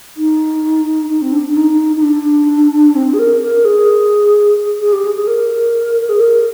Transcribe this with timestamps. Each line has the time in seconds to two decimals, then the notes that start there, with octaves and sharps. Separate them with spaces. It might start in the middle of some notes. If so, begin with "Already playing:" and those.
0.16 D#4
1.09 D#4
1.22 C4
1.33 D4
1.48 D4
1.56 D#4
1.96 D#4
2.02 D4
2.95 C4
3.13 G#4
3.19 A#4
3.41 A#4
3.65 G#4
4.81 G#4
4.93 G4
5.04 G#4
5.16 G#4
5.27 A#4
6.09 G#4
6.20 A#4